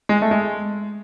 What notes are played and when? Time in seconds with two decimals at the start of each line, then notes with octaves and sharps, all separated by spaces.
0.09 G#3
0.22 A3
0.31 G#3